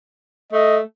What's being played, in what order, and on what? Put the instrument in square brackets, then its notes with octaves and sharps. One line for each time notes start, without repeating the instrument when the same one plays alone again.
[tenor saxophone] A3 [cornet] D#5